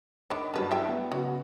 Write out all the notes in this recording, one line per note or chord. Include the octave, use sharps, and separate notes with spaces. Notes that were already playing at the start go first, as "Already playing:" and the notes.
D#3 D4 C#5 B5 D6
G2 F#3 C#4 B4 A5
E4 E5 G5
B3
C#3 F#3 B3 F#4